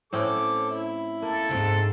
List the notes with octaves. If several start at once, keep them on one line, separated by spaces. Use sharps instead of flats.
A2 C4 C#4 A4 D6
E4
A#3 A4
C#2 G#2 C4